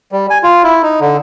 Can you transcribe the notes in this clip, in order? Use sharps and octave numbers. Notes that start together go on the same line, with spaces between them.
G3
G#5
F4
E4
D#4
D3